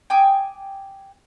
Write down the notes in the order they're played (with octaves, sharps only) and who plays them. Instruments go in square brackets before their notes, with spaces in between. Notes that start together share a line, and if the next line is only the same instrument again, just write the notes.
[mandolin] G5 G#5 D6 D#6